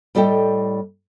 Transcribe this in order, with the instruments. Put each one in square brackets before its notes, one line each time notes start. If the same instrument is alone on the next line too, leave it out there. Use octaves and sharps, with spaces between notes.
[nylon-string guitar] A2 G3 A4 D#5 G5